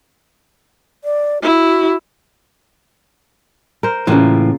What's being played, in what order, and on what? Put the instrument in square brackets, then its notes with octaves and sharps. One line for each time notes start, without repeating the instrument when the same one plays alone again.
[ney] D5
[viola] E4 [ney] F#4
[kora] A#4 C5
[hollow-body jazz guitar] A2 E3 [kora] C#3 A#3 F4